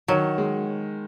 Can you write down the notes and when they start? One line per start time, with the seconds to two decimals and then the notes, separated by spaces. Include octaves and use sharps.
0.08 D#3 F#3
0.38 G#3